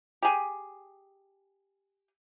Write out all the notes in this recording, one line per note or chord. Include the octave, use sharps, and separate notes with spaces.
G4 G#4